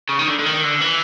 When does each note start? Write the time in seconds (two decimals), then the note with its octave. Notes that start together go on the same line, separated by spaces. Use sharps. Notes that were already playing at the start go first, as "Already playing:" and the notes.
0.09 C#3
0.19 D#3
0.27 D3
0.39 D3
0.46 D#3
0.64 D3
0.82 E3